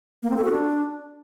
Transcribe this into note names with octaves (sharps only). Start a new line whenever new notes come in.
A#3
C4
A4
F#4
D4